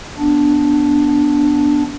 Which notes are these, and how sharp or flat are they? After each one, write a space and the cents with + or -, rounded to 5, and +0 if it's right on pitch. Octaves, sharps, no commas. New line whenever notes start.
B3 +5 D4 +0